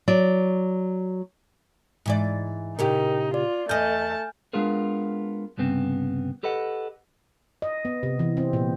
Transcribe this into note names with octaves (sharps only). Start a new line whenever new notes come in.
F#3 D5
G#2 E3 D5
A#2 C#3 D#4 G4 A#4 G5
F4 D5
E2 A3 D#5 G#5 A5 F6 G6
G#3 B3 D4 F4 G#4 A#4
C2 G2 C#3 B3 C4
G4 A4 B4 D#5 F#5
D#5
B3
C3
E3
C4
A#2